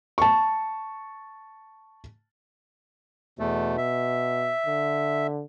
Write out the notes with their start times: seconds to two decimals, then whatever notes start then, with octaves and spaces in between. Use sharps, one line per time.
0.18 A5 C#6
3.39 E2 B2 A3
3.77 E5
4.66 D3